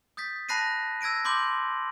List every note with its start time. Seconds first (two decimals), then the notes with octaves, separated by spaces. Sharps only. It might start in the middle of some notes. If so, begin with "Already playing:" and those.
0.17 D#6 G6 A6 B6
0.49 A5 B5 F#6 A#6 C7 D#7
1.01 E6 G#6 A#6 D7 D#7
1.25 B5 C6 D6 G6 F#7